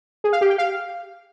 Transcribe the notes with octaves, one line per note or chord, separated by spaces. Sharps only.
G#4
F5
G4
G5
F5